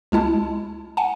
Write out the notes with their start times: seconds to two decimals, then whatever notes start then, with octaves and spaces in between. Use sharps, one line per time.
0.12 C#2 G#3 E4 A5
0.97 F#5 G#5 A5